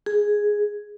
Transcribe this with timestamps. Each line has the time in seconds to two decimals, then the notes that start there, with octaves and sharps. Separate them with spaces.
0.06 G#4